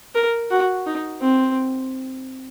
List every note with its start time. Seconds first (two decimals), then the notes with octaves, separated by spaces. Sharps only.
0.15 A#4
0.51 F#4
0.86 D#4
1.21 C4